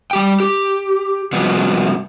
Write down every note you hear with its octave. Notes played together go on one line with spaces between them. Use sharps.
G3 G4 G5
G4
G2 C3 F3 B3 F#4